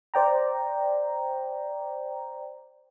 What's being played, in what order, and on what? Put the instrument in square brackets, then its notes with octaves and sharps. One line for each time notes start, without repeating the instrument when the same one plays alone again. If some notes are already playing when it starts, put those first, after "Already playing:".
[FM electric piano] C5 D5 G5 A#5